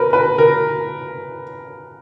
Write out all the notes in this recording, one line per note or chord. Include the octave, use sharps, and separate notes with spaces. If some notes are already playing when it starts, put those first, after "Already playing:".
Already playing: A#4 B4
B4
A#4